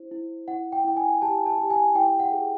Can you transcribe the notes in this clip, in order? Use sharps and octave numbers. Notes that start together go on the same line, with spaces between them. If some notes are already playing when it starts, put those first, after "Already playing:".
Already playing: E4 C5
E4
E4 F#5
G5
E4 G5
G#5
G4 A5
A5
G4
G#5
E4 G5
F#5
G#4